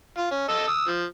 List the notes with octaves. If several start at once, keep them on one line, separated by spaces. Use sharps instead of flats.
F4
C#4
A4 D#5 E6
D#6 E6
F3